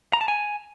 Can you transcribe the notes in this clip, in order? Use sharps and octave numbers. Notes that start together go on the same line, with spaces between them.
A#5
A5
G#5